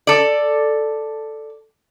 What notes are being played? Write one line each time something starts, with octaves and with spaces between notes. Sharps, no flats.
A4 D5